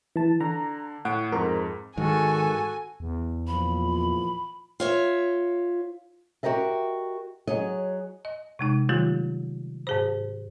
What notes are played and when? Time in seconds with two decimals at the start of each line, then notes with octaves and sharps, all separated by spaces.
0.16 E3 A5
0.41 D3 A#5
1.05 A2 F#5 D7
1.32 F2 G#2 A#4
1.97 G#2 D#3 F#4 A4 G#5
3.00 E2
3.47 A#2 E3 F3 B5
4.80 F4 C#5 E5
6.43 F#4 G4 A#4 D#5 E5
7.47 F#3 G#4 C#5 D#5
8.25 D#5
8.59 C3 G#3 D#4
8.89 D#3 F#3 G3 A3 F4 G4
9.87 G#2 G#4 C5